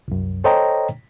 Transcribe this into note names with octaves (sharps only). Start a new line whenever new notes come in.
C2 F#2
A4 C5 C#5 D#5 G5 A#5